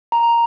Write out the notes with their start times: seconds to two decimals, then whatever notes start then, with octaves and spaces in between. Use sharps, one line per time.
0.12 A#5